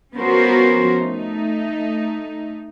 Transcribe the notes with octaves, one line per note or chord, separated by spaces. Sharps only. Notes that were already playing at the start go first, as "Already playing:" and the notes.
F3 B3 C#4 F#4 A#4 C5
A3 D#4